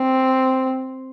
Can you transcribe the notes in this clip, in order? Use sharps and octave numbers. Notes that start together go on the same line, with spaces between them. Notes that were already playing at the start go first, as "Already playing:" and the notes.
Already playing: C4